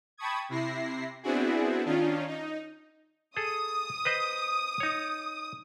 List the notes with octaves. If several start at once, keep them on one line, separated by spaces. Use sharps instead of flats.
G5 A5 B5 C#6 D#6 G#6
C3 E4 A#6 C7
B3 C4 D4 E4 F#4 G#4
D#3 C#4 D4 F4
D#4
G#4 A4 D#6
B4 C5 D#5
D#4 C#5